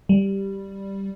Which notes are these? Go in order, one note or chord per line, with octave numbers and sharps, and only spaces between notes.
G3